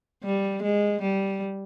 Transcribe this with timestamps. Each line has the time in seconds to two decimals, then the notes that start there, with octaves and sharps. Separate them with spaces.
0.24 G3
0.63 G#3
1.01 G3